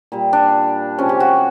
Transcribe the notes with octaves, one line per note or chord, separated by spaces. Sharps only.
A#2 G3
D4
C3 F3 G#3 C#4
G4
F#4